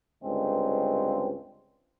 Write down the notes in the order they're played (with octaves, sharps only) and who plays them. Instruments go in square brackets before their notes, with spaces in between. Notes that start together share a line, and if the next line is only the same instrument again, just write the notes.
[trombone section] C#2 G2 D3 G#3 C4